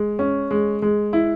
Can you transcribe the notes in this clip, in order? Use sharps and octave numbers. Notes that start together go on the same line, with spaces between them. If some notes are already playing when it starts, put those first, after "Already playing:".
Already playing: G#3
C#4
G#3
G#3
E4